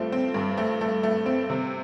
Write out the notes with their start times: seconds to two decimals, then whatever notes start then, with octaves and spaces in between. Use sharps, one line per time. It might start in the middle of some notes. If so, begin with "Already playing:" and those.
Already playing: G2 F3 A3 C4
0.12 C4
0.34 G2
0.57 A3
0.81 A3
1.03 A3
1.26 C4
1.50 C3